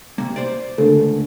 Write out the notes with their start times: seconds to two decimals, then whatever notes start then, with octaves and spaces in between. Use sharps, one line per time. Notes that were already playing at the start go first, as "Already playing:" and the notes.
0.18 C3 A#3
0.36 C5 D5
0.78 C#2 D3 A3